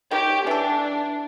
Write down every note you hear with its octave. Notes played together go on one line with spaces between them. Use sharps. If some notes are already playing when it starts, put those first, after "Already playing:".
D#3 G4 C#5
E3 D4 A4